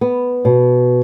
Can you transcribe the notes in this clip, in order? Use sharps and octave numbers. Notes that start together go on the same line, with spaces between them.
B3
B2